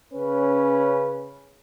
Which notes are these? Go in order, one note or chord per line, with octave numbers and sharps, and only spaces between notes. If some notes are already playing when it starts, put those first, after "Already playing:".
C#3 C#4 B4